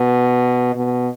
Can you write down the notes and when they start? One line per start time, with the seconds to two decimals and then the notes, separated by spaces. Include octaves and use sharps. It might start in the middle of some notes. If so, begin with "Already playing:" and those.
Already playing: B2
0.75 B2